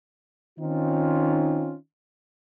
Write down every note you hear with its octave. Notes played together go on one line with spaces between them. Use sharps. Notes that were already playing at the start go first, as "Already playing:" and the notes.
D#3 C4 C#4 D#4 F4